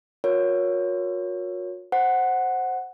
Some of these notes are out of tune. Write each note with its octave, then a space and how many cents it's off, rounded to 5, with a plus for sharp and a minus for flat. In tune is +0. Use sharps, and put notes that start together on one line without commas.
F#4 -45 A#4 +10 C#5 +5
C5 +0 F#5 +0